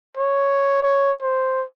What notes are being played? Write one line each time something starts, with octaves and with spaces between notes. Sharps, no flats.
C#5
C#5
C5